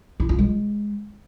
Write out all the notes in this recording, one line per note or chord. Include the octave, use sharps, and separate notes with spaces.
E4
F4
G#3